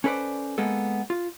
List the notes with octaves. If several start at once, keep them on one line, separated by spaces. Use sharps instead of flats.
C#4 A4 B4 C5 D5
G#3 A#3 B3 A4
F4